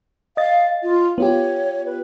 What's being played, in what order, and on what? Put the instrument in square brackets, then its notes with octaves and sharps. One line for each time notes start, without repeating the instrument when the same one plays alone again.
[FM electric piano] D#5 A6 [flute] F5
[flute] F4
[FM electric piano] B3 F4 G4 [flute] C#5
[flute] B4